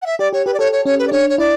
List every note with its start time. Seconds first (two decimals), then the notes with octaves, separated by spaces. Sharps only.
0.02 F#5
0.06 E5
0.19 G4 D5
0.33 G4 C#5
0.46 G4 B4
0.54 D5
0.59 A4 C#5
0.72 C#5
0.85 C#4 C#5
0.99 B4
1.07 D5
1.12 D4 C#5
1.29 C#5
1.38 E4 D5